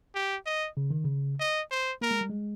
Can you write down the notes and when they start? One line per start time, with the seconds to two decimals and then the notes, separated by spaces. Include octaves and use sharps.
0.15 G4
0.46 D#5
0.77 C#3
0.91 D#3
1.04 C#3
1.40 D#5
1.71 C5
2.01 A#3 A#4
2.11 G#3
2.21 G3
2.30 G#3